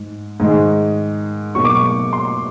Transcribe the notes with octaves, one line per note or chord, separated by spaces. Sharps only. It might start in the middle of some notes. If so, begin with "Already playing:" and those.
Already playing: G#2
G#2 D#3 G#3
B2 F#3 A#3 C#6
D6
C#6
C6